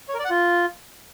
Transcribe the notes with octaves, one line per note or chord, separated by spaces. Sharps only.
C#5
A#4
D5
F#5
F4